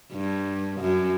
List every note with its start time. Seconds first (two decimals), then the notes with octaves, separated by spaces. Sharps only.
0.12 G2
0.80 F#2